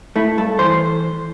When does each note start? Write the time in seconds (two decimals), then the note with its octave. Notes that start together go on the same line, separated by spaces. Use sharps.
0.16 A3 E4
0.38 G2 A4
0.59 E3 C5